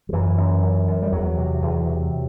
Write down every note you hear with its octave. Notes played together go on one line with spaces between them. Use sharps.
F#3
F#2 E3
F#2
F#2
F#2
G3
E2 F#3
C3
E2
C3